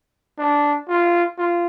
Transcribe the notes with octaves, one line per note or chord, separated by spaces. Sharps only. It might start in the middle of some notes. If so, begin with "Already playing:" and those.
D4
F4
F4